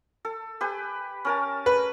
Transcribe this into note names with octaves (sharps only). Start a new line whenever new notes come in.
A4
G4 B4 G#5
C#4 A#4 A5
B4